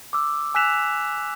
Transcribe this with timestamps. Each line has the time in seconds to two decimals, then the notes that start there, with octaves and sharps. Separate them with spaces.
0.13 D6 E6
0.55 G#5 E6 F#6 B6 E7 F7